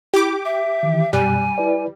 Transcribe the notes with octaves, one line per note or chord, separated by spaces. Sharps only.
E4 G4 D6
E5
D#3 E3
F#2 B2 G3 G#5 F#6
E4 B4 D5